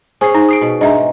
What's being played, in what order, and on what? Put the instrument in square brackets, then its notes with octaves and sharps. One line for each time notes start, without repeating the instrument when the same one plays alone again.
[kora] C#4 G#4 [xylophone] C5 C7
[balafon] D#4
[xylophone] D#6 C7 D7
[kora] B2
[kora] G#2 [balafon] D4 E5 [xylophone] D#5 A#5